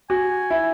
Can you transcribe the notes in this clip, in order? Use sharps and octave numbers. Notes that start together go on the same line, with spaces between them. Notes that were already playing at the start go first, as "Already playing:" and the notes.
F#4 G#5
E4